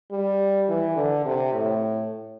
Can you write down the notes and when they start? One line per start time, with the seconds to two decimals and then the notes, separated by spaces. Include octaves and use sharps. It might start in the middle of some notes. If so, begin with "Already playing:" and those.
0.11 G3
0.69 E3
0.96 D3
1.25 C3
1.53 A2